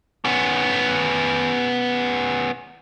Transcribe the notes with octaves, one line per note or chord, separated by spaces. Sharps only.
B3 C#4